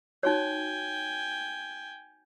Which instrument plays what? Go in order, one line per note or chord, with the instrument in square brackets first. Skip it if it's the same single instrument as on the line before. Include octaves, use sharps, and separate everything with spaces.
[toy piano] D#4 F#4 C#5 [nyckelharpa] G5 G#5